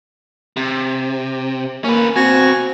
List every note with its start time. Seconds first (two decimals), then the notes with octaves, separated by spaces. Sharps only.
0.57 C3
1.84 A#3 C#4 B4
2.16 B2 C4 F#4 G#5